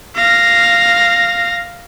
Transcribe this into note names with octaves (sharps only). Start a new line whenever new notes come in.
F5 A#6